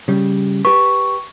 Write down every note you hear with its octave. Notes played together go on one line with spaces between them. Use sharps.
C#3 G3
G4 B4 C#6